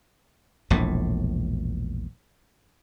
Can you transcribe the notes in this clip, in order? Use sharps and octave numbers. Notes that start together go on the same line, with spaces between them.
E1 A#1 A2